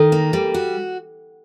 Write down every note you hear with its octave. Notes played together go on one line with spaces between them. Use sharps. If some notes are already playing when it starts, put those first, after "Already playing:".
Already playing: D#3 A4
A#3
G3
F#4